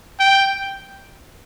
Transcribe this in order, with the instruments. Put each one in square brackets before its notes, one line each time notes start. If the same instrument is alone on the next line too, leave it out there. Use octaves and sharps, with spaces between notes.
[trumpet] G5